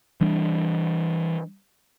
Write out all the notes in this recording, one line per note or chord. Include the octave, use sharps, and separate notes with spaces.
E3 G3 D4